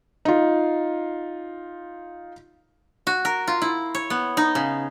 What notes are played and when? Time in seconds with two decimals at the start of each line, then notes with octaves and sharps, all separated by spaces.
0.25 D#4 F4
3.07 F#4
3.25 A#4
3.48 F4
3.62 E4
3.95 C#5
4.10 B3
4.37 D#4
4.55 C#3